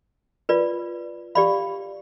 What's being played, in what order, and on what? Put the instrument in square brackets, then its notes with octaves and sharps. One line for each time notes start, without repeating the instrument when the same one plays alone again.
[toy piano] F4 B4 D5
G4 D5 F5 B5